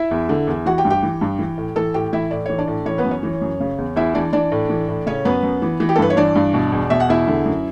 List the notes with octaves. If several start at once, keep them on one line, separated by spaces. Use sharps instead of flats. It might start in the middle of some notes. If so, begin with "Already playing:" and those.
Already playing: E4 E5
E2
D3
E2
E3 F#4 F#5
G4 G5
G2
G4 G5
E3
G2
E3
A2
E3 A4 A5
A2 G4 G5
E3 E4 E5
A2 D5
E3 C#5
D4 D5
A2
E3 C#4 C#5
B3 B4
F#2
C#4 C#5
E3
F#2
C#3
E2
E2 E4 E5
E3 D4 D5
E3 D4 D5
A2
E3
A2
C#3 C#4 C#5
F#2 B3 B4
F#2
E3
E3
G4
A4
G2 B4
C#5
E3 D4 D5
G2
B2
E2
B2 E5
F#5
E2 E4 E5
D3
F#2